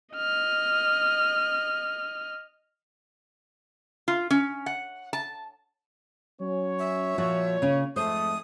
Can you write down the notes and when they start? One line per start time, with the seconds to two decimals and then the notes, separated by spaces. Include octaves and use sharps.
0.14 D#5 F6
4.08 F4
4.30 C#4
4.66 F#5
5.13 A5
6.41 F#3 C#4 C#5
6.79 E5
7.18 A#2 F3 F#4 C#5
7.62 C#3 C#4
7.96 F2 G#2 A3 C5 D#6